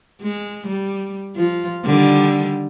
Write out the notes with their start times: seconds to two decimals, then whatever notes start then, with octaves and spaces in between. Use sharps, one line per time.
0.22 G#3
0.67 G3
1.36 F3 F4
1.85 D3 D#3 G3